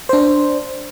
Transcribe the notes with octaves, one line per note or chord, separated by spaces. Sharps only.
D4 C5